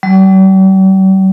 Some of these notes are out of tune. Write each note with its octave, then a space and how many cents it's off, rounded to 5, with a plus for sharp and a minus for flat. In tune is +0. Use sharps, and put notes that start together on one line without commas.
G3 -45